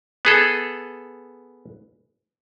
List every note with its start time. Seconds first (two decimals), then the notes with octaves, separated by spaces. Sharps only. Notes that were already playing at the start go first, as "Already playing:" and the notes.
0.25 B3 G#4 A4